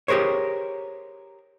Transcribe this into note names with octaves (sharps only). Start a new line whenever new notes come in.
G4 G#4 A#4 C5 C#5